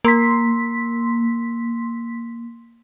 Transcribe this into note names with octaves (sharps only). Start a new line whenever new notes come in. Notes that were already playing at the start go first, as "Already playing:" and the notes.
A#3 C6 B6